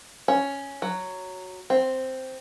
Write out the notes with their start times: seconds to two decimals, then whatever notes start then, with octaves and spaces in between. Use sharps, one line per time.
0.28 C#4
0.82 F#3
1.70 C4